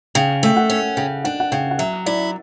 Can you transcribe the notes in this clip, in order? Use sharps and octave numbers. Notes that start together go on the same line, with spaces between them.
C#3 G5
A3 G5
F#5
C#4
C#3 G5
D4 F#5
F#5
C#3 G5
F#5
F#3 E5
E4 D5